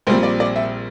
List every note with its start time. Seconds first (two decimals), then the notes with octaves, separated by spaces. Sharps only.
0.07 A#1 A#2 G3 C4 C5
0.23 D5
0.40 D5
0.56 E5